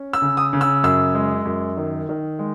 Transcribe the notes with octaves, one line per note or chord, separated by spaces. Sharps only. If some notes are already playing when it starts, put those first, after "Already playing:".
Already playing: C#4
E6
C#3
D#6
C#3
E6
F#2 E6
G#3
F#2
D#3
D#3
G#3